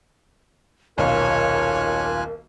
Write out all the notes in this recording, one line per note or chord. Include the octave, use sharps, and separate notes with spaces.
D#1 B1 F4 A#4 C#5 F5 G#5 F#6